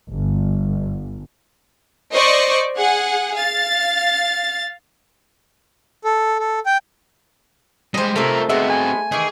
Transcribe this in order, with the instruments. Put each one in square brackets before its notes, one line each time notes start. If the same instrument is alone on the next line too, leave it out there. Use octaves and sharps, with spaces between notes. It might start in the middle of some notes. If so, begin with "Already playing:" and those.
[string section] G1
[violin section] C5 D5 D#5 C#6
G#4 F#5
F5 A6
[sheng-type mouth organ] A4
A4
G5
[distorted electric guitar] G3 G#3 [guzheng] C5 D#5
[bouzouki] C3 F4 A4 [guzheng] A3 [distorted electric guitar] A#4 E5
[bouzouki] G#3 B3 [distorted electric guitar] C4 F#4 [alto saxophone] E5
[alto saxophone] G#5
[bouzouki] D#3 E3 [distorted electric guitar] G#4